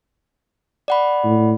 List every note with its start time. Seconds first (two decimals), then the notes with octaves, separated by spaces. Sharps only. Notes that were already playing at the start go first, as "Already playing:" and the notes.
0.88 D5 F#5 B5
1.25 A2